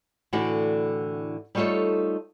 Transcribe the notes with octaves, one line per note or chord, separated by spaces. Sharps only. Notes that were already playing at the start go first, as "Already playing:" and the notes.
A2 D3 E3 A3 F#4 D5
G3 A3 D#4 F4 A4 C#5